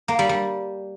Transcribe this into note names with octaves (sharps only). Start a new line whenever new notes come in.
A#3
G3
G3